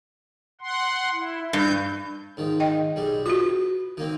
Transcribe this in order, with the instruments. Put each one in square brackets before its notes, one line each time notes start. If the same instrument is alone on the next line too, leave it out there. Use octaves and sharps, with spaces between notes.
[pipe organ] F#5 C6
E4
[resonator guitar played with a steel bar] G2 [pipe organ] G6
[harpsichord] G#2 D#3 F3
[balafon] D#5 G5
[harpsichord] B1 G3 G#3
[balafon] F4 F#4 [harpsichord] B4
[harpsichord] D#3 A#3 C4